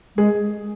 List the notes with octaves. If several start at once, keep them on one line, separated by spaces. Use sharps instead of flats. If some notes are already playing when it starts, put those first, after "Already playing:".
G#3 G#4